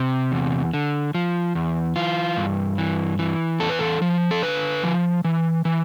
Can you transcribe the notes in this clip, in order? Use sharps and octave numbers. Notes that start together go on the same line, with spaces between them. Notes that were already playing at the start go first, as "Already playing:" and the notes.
Already playing: C3
E2
D3
F3
E2
E3 F4
G2
E3
E3
E2 A4
B4
A4
F3
A4
D3 B4
F3
E3
E3